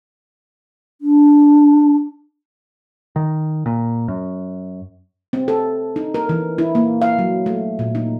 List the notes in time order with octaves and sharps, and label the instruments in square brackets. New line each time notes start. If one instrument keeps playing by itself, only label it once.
[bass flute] D4
[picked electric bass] D#3
A#2
F#2
[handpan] C4
A4
D#4
A#4
E3
E4
A#3
F5
F#3
A3
A#2
D#4